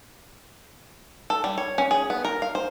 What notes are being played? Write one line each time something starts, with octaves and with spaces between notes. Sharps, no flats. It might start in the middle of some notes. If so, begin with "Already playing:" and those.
A4
G3
C#5
C#4
G#4
B3
A#4
F5
C5